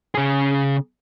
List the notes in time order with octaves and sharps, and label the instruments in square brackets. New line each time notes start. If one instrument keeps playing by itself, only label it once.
[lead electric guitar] C#3 G#4